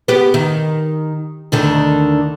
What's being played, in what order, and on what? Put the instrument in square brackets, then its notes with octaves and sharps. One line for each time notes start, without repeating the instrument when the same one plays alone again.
[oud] B3 G4
D#3
D2 D3 D#3